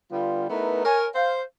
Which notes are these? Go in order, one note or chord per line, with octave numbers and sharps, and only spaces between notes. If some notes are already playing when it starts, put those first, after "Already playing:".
D3 G3 B3 F4
A3 B3 D#4 E4 A#4 B4
A#4 C#5 G#5
C5 F5